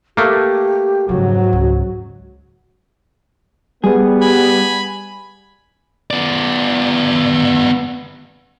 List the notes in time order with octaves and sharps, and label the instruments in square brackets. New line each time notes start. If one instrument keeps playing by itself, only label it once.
[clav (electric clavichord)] A3 A#3 [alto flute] G4
[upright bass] F2 C#3 [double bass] G#2 F#3 [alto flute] F#4
[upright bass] C#2
[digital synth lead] G3 [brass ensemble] B3 [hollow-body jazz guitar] G#4
[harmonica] G#5 B5
[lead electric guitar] B3 D5